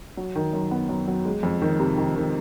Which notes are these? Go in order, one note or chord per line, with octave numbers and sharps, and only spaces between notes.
F#3
D#3
F#2
B3
F#2
F#3
G#3
F2
D#3
C3
D#3
D#3